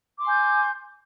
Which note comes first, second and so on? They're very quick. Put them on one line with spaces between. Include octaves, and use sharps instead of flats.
D6 C6 G#5 G6